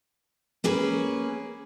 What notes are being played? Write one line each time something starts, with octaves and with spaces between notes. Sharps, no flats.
A#3 C#4 G#4 B4